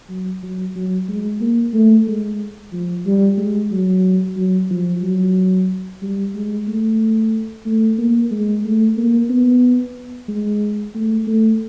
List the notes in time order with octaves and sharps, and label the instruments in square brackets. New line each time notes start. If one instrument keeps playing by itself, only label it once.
[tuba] F#3
F#3
F#3
G#3
A#3
A3
G#3
F3
G3
G#3
F#3
F#3
F3
F#3
G3
G#3
A3
A3
A#3
G#3
A3
A#3
B3
G#3
A3
A3